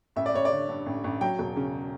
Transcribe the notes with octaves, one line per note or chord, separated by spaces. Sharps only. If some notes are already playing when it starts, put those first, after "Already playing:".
A1 E5
D5
A1 C#5
D5
D3
G2
A1
A1
F#3 G5
E1
C#3